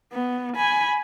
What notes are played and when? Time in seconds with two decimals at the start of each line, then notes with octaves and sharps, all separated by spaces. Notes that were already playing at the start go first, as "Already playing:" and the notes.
0.13 B3
0.56 G#5 B5